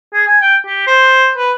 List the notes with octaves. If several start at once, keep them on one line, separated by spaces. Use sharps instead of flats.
G#4
G#5
G5
G4
C5
B4